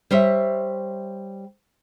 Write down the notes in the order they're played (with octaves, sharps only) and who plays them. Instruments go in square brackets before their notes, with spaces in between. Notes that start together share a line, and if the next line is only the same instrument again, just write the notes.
[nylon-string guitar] G3 C5 C#5 E5